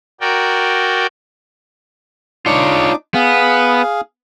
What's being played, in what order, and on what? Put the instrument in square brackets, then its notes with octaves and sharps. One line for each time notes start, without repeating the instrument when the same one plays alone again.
[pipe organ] F#4 A#4 D5 G5
[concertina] D4 D#4 D6 [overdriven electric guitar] F4 C#5
[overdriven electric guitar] B3 [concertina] G#4 F5